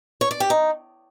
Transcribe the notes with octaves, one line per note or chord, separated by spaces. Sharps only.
C#5
D5
G4
D#4